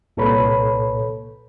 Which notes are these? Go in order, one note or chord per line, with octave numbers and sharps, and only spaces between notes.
C2 A#2 A4 B4 C#5 B5